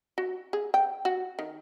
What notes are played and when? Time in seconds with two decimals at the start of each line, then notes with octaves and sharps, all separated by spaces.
0.18 F#4
0.53 G#4
0.74 G5
1.05 F#4
1.39 D#3